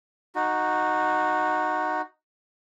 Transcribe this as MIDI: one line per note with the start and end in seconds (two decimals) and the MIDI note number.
0.35 2.02 63
0.35 2.02 66